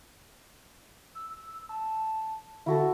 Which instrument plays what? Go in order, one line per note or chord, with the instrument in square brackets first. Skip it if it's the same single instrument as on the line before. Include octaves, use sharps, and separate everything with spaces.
[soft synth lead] E6
A5
[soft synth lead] D3 [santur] E4 F#4 A4